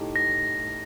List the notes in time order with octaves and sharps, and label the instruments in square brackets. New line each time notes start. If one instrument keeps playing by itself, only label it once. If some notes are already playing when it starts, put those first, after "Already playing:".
Already playing: [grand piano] A2 A3 D#4 G4
[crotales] A#6